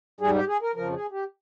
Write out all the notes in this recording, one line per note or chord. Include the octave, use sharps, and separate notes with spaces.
G#2 G3 G#4
G4
G#4
A#4
F2 C#3 F3 A#4
G#4
G4